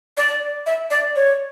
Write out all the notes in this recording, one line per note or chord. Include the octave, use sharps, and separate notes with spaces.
D5
E5
D5
C#5